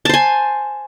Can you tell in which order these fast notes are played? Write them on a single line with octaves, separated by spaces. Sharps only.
A5 C5 G#5